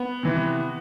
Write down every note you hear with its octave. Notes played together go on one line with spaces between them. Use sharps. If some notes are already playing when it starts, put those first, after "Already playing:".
Already playing: B3
C3 E3